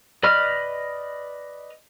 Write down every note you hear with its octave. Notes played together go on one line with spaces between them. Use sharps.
B4 D5 D#5 B5 F6